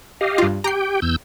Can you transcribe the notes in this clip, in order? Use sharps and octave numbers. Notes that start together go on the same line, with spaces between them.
G4 D#5 F5
G2 F4
G4 G5 A#5 C7
E2 E6 G6